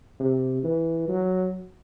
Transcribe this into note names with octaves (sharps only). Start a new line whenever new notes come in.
C3
E3
F#3